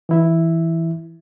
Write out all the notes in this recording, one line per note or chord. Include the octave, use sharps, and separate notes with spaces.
E3 E4 E5